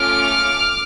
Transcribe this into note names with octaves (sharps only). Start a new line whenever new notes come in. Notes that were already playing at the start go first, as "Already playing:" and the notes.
Already playing: A3 C#4 F4 D6 F6